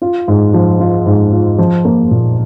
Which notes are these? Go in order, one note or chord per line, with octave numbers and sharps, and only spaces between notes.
F4
G#2
F3
F4
G#2
F4
F3
A#3
A#2